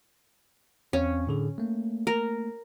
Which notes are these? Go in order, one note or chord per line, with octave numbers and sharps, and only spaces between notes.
E2 C4 C#4 F5
A2 D3 G#4
A3 A#3
A#4